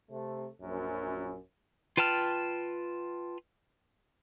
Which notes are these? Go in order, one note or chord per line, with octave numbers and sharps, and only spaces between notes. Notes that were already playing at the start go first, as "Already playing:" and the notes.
C3 A3
A#1 F#2
F4 B4 G5 A5 F6